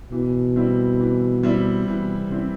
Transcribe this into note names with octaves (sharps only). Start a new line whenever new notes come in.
B2 E3
G3 C4 E4
E3
G3 C4 E4
B2 E3
C3
G3 C4 E4